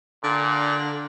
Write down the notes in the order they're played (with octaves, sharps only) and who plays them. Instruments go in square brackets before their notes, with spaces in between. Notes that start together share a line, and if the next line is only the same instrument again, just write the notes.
[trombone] A#2 [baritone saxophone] D3